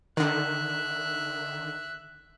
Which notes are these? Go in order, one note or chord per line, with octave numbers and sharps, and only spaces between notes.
D3 D#3 E5 F#6